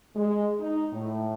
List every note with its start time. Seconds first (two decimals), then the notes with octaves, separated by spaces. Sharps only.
0.15 G#3
0.59 D#4
0.92 A2